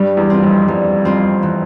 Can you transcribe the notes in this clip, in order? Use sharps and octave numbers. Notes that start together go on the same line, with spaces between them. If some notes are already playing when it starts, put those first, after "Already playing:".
Already playing: G2 G3
E2
C4 F4
F2
E2 G3
F2 C4 F4
E3